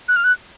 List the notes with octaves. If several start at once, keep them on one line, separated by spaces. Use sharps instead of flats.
F#6
F6
F#6